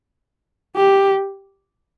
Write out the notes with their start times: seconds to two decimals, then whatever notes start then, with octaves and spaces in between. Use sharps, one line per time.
0.76 G4